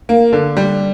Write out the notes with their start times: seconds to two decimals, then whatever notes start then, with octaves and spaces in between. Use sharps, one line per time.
0.09 A#3
0.33 D3
0.57 G3